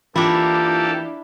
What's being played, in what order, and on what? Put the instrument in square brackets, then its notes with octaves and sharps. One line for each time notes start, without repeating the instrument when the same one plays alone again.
[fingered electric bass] E3 [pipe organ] A#3 G4 A4 [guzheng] D4 E4 [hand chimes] F4